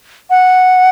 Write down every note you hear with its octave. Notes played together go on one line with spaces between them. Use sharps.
F#5